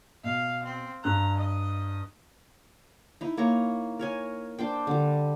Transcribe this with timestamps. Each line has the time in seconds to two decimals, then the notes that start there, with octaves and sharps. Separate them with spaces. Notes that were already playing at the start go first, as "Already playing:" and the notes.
0.24 B2 F5
0.63 C4
1.04 G2 A#5 F#6
1.38 D#5
3.21 D#4 E4
3.37 A#3 C#5 A#5 C#6
3.99 A#4 C#5 G#5
4.59 D4 C5 G5
4.87 D3 G3